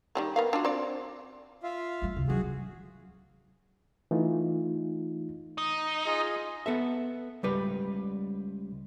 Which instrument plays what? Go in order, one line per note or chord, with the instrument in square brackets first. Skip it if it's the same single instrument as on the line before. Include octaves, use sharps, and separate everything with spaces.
[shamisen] D#3 G3 A#3
B3 A#4 F5
D4 F4 F#4
C4 D5
[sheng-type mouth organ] F4 E5 F5
[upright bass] G3 A3
D2 C3
[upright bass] F3 F#3 [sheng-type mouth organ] F#4 G#4
[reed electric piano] E3 A3 D#4 F4
[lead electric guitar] D#4
[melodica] F4 G#4 D#5
[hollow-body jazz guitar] B3 A4 E5
C#2 G3 B4